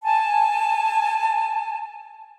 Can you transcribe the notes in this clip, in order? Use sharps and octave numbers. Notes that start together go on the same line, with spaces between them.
G#5 A5